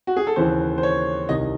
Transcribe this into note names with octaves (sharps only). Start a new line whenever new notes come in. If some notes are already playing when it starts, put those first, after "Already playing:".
F#4
G#4
A4
D#2 C#3 E3 C5
C5
C#5
C2 C3 D#3 D#5